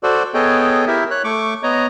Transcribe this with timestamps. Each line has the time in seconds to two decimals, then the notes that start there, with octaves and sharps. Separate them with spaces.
0.03 F#4 A4 C5 D5
0.34 B3 G#4 A4 C#5 D#5 G5
0.87 E4 G4 A#4 E5
1.11 C#5 F#6
1.24 A3 C#6 D6
1.63 B3 C#5 D#5 A#5